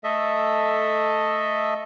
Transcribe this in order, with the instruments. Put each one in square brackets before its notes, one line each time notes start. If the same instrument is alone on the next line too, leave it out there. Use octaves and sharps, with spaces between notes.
[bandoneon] A3 A4 D#5 E5